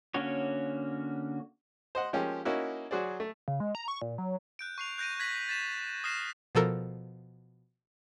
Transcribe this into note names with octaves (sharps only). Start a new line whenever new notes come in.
D3 A#3 C#4 F#4 C#5
C5 D#5 F#5
F3 G#3 A#3 C#4 G4
A#3 C#4 D#4 E4 F#4
F#3 F#4 G#4 C5 D5
A3
C#3
G#3
A#5
C#6
A#2
F#3
F#6 G6 D7
C#6 C7 F7
F#6 G6 A#6 D7 D#7
F#6 G#6 A#6 B6 F#7
A6 B6 E7
D#6 F6 F#6 A#6 C7 E7
B2 F3 A4 A#4